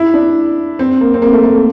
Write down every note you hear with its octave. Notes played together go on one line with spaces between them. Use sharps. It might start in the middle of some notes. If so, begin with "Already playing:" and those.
Already playing: E4
D4
C4
A#3
C4
A#3
A3
A3
A#3